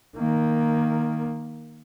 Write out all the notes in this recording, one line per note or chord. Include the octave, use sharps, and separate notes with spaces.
D#3 A#3